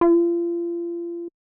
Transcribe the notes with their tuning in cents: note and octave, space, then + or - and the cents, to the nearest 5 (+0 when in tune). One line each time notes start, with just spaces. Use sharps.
F4 -35